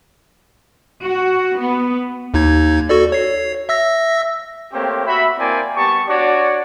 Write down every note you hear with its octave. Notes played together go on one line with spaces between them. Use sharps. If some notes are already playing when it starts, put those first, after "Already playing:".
F#4
B3
D#2 D#4 G#6
F#4 A4 D5
C#5 C7
E5 E6 A#6
A3 A#3 C4 G4 C5 C#5
F#4 E5 B5
A#3 C4 E4 D5 G5 G#5
G3 B3 G4 A5 C#6
D4 F#4 C#5 D5